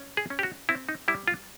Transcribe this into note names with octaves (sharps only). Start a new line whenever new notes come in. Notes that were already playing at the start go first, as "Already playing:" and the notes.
Already playing: C#4
G#4
C#4
G4
F#4
C4 E4
D#4
G3 E4
F4